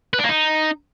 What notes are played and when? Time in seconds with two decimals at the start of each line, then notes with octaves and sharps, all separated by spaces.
0.14 B4
0.19 D4
0.24 A#3
0.29 D#4